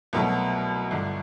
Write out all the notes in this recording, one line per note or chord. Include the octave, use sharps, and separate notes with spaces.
C2 B2 F#3 A3
G1 G2 D3